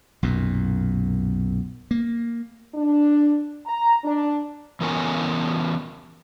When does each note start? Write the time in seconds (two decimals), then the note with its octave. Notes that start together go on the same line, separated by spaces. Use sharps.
0.23 B1 F#2 A#2
1.91 A#3
2.75 D4
3.66 A#5
4.04 D4
4.81 E3 B3 C#4 A#4 C#5 G#5